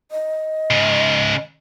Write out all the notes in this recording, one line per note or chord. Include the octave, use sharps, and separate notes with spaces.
D#5
G#2 C#3